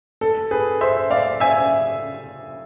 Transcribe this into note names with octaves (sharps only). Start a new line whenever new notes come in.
A4
G#4 B4
C5 E5
D5 F5
E5 G#5